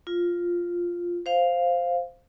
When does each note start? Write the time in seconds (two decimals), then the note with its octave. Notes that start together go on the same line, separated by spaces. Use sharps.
0.07 F4
1.26 C5 F5